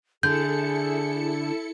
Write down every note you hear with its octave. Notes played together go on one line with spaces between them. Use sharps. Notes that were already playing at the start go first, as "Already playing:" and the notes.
D3 E4 G#4 A4 G6 C#7